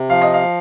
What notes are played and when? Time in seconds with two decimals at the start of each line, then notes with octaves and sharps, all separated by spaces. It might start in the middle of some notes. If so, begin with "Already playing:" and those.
Already playing: C3
0.10 F3 F5
0.22 D#5
0.34 F5